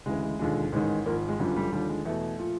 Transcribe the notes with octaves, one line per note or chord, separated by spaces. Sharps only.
D2 C#3 E3 G#3
G#3
E1 D#2 D3 F3 G#3
A1 G#2 D#3 G#3
G#1 G#2 F3 A#3
G#3
G1 F#2 D3 F3 G3
G3
D#2 D3 F3 G3
G#3
E2 B2 A3
A#2 F3